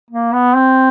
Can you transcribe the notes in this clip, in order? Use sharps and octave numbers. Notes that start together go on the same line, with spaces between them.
A#3
B3
C4